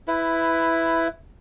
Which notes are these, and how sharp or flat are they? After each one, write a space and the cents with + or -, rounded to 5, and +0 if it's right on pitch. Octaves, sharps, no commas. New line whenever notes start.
E4 +0 B4 +10